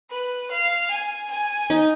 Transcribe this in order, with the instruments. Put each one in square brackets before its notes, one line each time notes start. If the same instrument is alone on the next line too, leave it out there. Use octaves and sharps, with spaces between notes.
[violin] B4
F5
G#5
G#5
[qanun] D#4